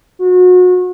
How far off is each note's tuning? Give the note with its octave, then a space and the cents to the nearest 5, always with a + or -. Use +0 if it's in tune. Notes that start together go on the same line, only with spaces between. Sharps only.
F#4 -30